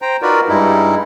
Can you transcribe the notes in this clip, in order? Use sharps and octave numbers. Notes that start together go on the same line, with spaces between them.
C5 G5 A#5
D#4 F4 F#4 A#4 B4 D5
G2 G3 G#3 D#4 E4